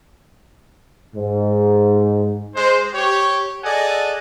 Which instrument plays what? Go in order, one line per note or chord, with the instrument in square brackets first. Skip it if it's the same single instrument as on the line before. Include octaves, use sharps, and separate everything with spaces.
[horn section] G#2
[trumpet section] G#3 C5
G4 C#5
G#4 A4 D5 D#5 F#5 G#5